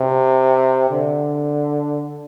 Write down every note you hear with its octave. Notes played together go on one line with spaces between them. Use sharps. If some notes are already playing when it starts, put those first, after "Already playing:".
Already playing: C3
D3